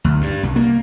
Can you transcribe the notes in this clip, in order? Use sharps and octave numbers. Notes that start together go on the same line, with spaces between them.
D2
G2
C2
A#3